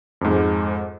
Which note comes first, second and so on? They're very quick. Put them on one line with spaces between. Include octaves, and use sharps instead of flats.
F2 G#2 G#3